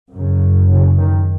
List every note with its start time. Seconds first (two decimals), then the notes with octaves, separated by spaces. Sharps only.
0.13 F#2 C#3
0.70 C#3
0.98 D#3